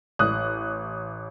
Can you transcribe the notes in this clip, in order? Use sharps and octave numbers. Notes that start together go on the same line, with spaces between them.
A1 D#6 F#6